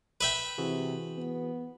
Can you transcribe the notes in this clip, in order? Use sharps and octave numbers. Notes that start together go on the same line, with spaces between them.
B4 E5 G5
C3 E3 F#4 G#4
B3